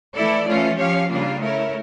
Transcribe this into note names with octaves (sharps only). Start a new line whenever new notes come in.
E3 A3 E4 A4 D5
E3 A3 C#4 F4
F3 C#4 G4 C#5 F5
C#3 G3 A#3 D4 F4
A3 E4 A#4 C#5